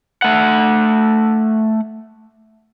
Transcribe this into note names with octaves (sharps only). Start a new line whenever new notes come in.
A3 F#5